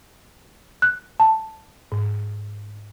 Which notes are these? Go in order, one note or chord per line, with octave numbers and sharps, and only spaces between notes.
F#6
A5
G#2